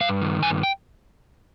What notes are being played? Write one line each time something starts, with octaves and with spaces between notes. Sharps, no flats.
G2 F5
D#3
G2 G#5
G5